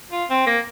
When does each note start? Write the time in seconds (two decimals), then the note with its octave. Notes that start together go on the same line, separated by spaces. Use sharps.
0.12 F4
0.30 C4
0.47 A#3